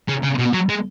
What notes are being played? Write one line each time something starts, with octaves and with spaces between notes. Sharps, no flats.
C#3
C#3
B2
F#3
G#3